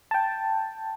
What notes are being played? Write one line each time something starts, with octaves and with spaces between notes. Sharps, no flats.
G5 A5